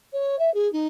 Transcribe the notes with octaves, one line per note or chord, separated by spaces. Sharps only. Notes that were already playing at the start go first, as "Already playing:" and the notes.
C#5
E5
G#4
D#4